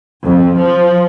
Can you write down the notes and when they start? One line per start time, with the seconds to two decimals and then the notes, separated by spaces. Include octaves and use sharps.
0.24 F2
0.59 F3